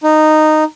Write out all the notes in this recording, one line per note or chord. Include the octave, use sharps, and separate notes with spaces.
D#4